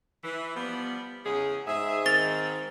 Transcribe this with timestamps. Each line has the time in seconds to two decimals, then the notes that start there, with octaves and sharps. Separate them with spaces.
0.24 E3
0.56 F3 G3 B3
1.26 E2 C#3 G#4
1.67 G#2 G#4 E5
2.06 D#3 C4 A6 F7 G7